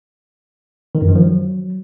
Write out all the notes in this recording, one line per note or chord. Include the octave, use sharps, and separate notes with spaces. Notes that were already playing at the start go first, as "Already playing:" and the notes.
D#3
F#2
D#3
F3
F#3